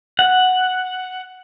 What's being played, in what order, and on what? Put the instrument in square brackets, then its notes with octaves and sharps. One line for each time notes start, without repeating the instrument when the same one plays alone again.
[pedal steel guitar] F#5